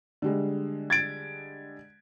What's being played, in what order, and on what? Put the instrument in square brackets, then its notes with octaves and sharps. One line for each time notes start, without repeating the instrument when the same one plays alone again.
[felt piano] D3 G3 G#3
[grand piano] G#6 A6 D7